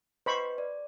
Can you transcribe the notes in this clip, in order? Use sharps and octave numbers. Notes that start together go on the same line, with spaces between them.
B4 C5 D#5 B5 C#6
D5